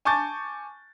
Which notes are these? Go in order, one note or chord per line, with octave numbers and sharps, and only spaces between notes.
G#5 A5 C#6 D6 G6 A6